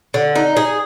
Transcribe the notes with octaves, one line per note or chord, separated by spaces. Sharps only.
D3
D#4
G#4